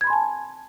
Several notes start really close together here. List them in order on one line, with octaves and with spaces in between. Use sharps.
G#6 B5 C6 G#5 A5